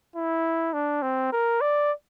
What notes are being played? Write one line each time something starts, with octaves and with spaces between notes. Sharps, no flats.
E4
D4
C4
A#4
D5